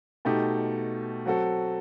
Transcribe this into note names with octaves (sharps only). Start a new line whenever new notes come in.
B2 A3 D#4 G4
F#3 C4 F#4 A4